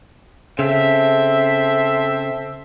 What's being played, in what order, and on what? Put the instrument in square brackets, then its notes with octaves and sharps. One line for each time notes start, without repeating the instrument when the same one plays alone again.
[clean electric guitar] C#3 [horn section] C4 A4 E5